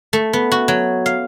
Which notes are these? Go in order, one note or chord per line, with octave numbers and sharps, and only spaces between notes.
A3
B3
F#4
F#3
F5